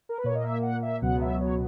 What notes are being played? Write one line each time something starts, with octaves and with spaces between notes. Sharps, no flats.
A#4
B4
A#2 A#3 C#5
D#5
E5
F#5
E5
C#2 B2 F#3 B3 F#5
E5
C#5